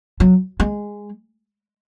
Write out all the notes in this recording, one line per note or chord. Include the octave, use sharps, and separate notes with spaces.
F#3
G#3